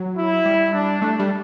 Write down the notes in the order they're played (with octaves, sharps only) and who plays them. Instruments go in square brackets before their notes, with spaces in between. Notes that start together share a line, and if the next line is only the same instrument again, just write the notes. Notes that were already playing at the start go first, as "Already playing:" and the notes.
Already playing: [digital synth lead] F#3
[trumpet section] E4
[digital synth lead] G3
[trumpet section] D4
[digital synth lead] A3 [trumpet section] D4
[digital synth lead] G3